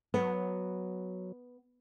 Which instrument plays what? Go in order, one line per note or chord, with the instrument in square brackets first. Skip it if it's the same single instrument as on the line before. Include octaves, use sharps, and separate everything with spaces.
[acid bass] F#3 [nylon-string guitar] B3